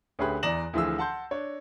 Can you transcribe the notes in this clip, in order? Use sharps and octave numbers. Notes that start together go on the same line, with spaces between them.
D2 C#4 G4 G#4 B4 F#6
E2 D5 A#5 A#6 E7 F#7
D2 E3 F3 F4 G#4 E6
F#5 A5 C6 G6
D4 C#5